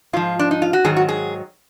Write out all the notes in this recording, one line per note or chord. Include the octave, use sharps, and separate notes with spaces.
G#2 F3 F4
D4
D#4
F4
F#4
G#2 D#3 F#3 G#4
F#4
G#4